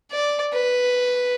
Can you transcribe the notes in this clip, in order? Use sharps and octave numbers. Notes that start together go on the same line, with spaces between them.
D5
B4